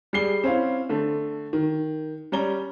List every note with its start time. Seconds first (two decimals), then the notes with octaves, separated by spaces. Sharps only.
0.13 G3 G#4 C7 G7
0.44 C4 C#4 E4 F5
0.89 D3 A3
1.53 D#3
2.32 G3 C#4 A#5 G7